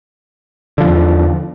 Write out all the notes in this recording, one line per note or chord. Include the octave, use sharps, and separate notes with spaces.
E2 D3 F3